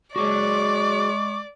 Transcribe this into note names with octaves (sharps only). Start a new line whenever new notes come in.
G#3 F#4 G#4 C#5 D5 C#6 D6